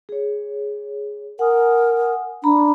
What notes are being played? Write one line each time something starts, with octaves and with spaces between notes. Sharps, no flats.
G#4 C#5
A#4 F#5 G#5 D#6
D4 A#5 B5